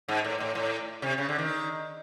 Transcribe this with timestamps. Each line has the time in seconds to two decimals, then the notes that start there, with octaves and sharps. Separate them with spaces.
0.08 G#2
0.24 A2
0.40 A2
0.55 A2
1.02 C3
1.18 C#3
1.29 D3
1.39 D#3